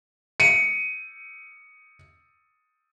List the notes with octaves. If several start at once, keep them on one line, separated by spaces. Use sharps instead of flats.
C#7 D#7